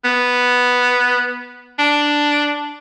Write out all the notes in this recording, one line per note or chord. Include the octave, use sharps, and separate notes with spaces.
B3
D4